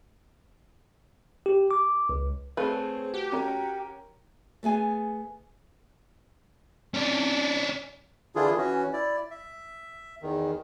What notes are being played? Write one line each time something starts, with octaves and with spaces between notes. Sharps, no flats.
G4
D6
C#2
A3 C4 G#4 B4 C#5 F5
F#4 G4
C#4 A#4
A3 B3 G#4 G#5
C#4 D4
D3 E3 D4 E4 F4 G#4
E3 C#4 F#4
E4 D5
E5
E2 D#3